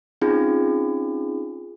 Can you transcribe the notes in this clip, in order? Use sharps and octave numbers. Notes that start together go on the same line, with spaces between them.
C4 C#4 D#4 F4 G#4